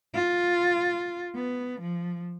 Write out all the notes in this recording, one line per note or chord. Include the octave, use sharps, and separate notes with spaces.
F4
B3
F3